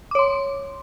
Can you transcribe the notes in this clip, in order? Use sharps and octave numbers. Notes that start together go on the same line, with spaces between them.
C#5 C6 D6